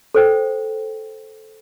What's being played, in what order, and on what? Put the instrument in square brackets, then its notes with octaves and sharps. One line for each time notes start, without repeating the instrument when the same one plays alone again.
[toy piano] A4 C5 G5